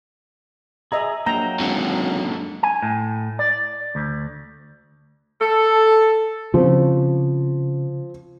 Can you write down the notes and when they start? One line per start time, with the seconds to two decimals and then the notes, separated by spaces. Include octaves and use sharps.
0.92 G#4 D#5 E5 A#5
1.26 A#1 F#3 A#3 G5 A#5
1.60 G#1 F#2 D3
2.63 G#5
2.82 A2
3.39 D5
3.95 D2
5.41 A4
6.54 C#3 F3 C4